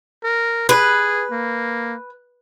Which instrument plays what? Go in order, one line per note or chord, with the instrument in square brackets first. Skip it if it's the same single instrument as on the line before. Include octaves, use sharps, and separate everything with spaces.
[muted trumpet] A#4
[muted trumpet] G#4 [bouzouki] B4
[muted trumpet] A#3